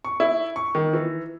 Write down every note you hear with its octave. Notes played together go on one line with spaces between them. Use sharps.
C#6
E4
C#6
D#3
E3